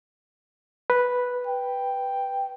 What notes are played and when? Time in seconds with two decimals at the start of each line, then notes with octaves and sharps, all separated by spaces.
0.90 B4
1.47 G5